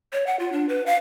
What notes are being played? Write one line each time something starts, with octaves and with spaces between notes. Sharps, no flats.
C#5
F#5
F4
D4
B4
F5